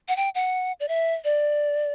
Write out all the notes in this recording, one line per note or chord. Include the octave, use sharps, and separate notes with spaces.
F#5
G5
F#5
D5
E5
D5